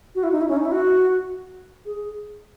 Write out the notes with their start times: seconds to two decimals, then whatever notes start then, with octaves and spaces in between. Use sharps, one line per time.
0.15 F#4
0.24 E4
0.32 D#4
0.41 E4
0.48 C#4
0.57 D#4
0.65 E4
0.72 F#4
1.86 G#4